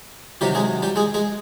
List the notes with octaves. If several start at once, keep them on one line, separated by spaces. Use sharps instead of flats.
C3 D#3 F#3 G3 G4
G#3 G#4
G3 G4
G#3 G#4
G#3 G#4